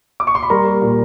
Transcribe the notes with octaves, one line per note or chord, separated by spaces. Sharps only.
D6
C#6
C6
B5
G3 A#4 A#5
A#3
A#2